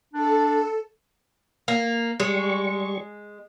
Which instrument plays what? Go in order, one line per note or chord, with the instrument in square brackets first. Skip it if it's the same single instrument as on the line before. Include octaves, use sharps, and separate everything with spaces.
[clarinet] D4 [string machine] A4
[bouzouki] A#3
[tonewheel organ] G3 C#6 [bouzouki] G#3